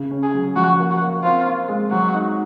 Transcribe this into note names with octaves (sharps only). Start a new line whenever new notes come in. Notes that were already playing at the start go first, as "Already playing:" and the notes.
Already playing: C#3
C#4
G#4
F#3
F3 F#4
A#3
F#4
A#3
C4 F4
C4
G#3
F#3 F#4
D#4